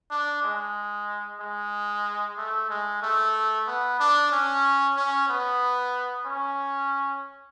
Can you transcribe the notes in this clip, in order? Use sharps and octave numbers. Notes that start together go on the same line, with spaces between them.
D4
G#3
G#3
A3
G#3
A3
B3
D4
C#4
C#4
B3
C#4